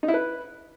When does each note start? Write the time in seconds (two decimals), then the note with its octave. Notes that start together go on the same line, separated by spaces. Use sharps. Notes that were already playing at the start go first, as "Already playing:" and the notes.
0.03 D#4
0.08 E4
0.14 B4